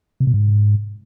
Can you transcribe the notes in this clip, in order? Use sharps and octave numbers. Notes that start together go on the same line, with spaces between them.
C3
B2
G#2